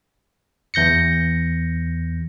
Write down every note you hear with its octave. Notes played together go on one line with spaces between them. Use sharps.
E2 G6 A#6 C#7